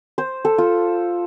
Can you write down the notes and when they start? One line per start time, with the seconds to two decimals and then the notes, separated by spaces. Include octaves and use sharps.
0.18 C5
0.45 A4
0.58 F4